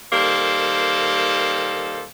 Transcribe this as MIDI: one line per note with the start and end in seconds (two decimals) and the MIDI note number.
0.13 2.04 51
0.13 2.04 55
0.13 2.04 58
0.13 2.04 69
0.13 2.04 72